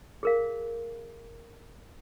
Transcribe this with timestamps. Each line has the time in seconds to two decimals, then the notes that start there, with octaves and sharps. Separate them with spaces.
0.23 G#4 A#4 F5